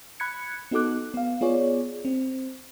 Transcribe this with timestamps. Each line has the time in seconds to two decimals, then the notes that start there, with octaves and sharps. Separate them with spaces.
0.20 B5 F#6 G#6 C#7
0.71 B3 D#4 F#4 A4 D6 F#6
1.14 B3 F5
1.41 B3 F4 G#4 C#5 D5
2.05 C4